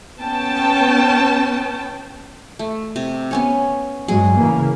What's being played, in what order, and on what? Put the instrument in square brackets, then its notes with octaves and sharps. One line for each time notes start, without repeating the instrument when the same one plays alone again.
[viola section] B3 C#4 G5 A5
[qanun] A3
C3
B3 C#4 C#5
[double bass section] G2 F#3 G#3 [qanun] G#4
[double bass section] C#3 E3 A#3